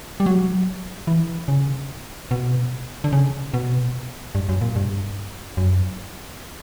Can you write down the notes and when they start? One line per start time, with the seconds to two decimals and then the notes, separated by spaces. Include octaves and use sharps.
0.20 G3
0.26 F#3
1.07 E3
1.48 C#3
2.31 B2
3.04 D3
3.12 C#3
3.54 B2
4.35 G2
4.49 F#2
4.61 A#2
4.76 G2
5.57 F#2